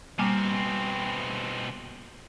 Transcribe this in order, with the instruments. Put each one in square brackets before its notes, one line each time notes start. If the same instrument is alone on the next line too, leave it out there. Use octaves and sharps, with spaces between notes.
[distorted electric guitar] B2 C4 [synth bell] G3 A#3 G#5